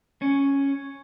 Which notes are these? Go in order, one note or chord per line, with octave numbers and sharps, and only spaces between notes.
C#4